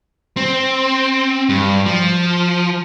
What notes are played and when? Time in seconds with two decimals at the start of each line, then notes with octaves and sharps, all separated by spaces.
0.37 C4
1.49 G2
1.86 F3